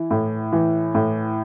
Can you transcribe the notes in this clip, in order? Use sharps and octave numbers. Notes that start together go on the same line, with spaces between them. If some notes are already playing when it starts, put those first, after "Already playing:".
Already playing: E3 E4
A2
E3
A2